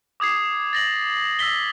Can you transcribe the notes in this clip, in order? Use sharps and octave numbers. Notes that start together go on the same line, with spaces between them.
D6 D#6 G#6 C7
A6 A#6 F#7
E6 A#6 B6 G7